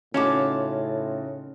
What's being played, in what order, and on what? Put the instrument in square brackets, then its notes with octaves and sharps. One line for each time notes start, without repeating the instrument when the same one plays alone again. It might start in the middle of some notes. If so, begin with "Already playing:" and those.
[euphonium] A2 [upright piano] C#3 D#4 F#4 [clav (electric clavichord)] C#4 [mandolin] F4 A5 D6